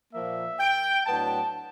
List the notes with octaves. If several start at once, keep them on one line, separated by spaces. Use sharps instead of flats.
A#2 F3 A#3 E5
G5
A2 F#3 B3 D4 A5